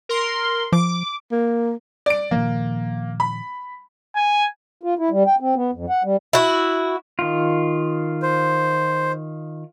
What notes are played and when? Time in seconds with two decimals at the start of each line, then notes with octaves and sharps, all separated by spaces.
0.09 A#4 C6
0.72 F3 D6
1.31 A#3
2.06 D5 D7
2.31 A#2 D#3 F3 A#3
3.20 B5
4.16 G#5
4.83 F4
4.99 E4
5.10 G3
5.27 G5
5.40 C4
5.56 B3
5.73 F2
5.89 F#5
6.04 G3
6.33 E4 F#4
7.19 D#3 F4
8.22 C5